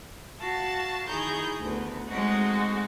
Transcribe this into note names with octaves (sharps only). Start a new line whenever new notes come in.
F#4 F5 A5
D#3 E4 G#4 A#5 C#6 G6
D2 B3
G#3 A3 C4 D#4 F#4